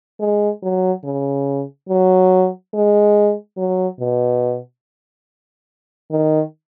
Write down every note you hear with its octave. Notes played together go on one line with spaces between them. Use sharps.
G#3
F#3
C#3
F#3
G#3
F#3
B2
D#3